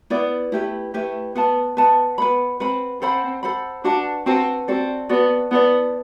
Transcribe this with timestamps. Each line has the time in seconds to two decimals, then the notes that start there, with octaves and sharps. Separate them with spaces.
0.10 B3 E4 B4 D5
0.52 A3 E4 G4 B4 E5
0.94 A3 E4 G4 B4 E5
1.35 B3 B4 F#5 A5
1.77 B3 B4 F#5 A5
2.18 B3 B4 F#5 B5
2.60 C4 B4 F#5 B5
3.01 C4 A4 C5 F#5 B5
3.43 A4 C5 F#5 B5
3.84 D4 F#4 B4 F#5 A5
4.26 C4 F#4 B4 F#5 A5
4.68 C4 F#4 A4 D5
5.09 B3 F#4 A4 D5
5.51 B3 E4 A4 D5